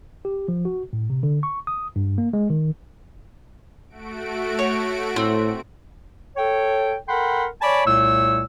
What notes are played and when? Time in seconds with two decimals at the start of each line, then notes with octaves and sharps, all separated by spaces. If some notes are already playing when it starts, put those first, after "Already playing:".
0.25 G4
0.48 F3
0.65 F#4
0.93 A2
1.10 C3
1.23 D3
1.43 C#6
1.67 D#6
1.96 G2
2.18 A#3
2.33 G#3
2.50 D#3
3.89 A3 F#4 D7
4.59 C#5
5.16 A2 C4
6.37 A4 C#5 G5
7.08 A4 A#4 F#5 G5 B5 C6
7.62 C#5 D5 G#5 A5 B5 D6
7.86 C2 A#2 A3 C#5 E6